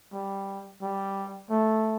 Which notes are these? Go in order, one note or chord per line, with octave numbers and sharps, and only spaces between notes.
G3
G3
A3